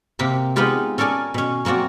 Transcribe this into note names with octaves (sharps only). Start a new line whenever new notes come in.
C3 A#3 G4
G#3 B3 C4 D#4 F4 G4
C#4 A4 A#4 D5 G#5
B2 C#4
F#3 A#3 C4 F#4 D5